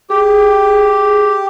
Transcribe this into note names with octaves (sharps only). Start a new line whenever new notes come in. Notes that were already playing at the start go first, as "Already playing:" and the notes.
G4 G#4